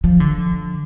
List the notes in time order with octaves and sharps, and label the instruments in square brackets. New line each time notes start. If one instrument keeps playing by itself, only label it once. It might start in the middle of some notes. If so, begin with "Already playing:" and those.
[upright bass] F3
D3